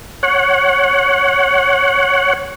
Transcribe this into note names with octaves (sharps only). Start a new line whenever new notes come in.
C#5 F#5